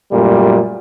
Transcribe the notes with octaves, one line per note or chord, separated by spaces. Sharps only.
F#2 A#2 G3 A3